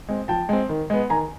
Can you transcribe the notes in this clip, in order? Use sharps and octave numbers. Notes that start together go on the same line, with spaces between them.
G#3 C4
F3 G5 A5
G#3 C4
D#3
G#3 B3
D#3 G#5 A#5